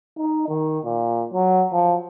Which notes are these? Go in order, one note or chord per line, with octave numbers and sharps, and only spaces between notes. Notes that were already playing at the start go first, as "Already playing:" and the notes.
D#4
D#3
A#2
F#3
F3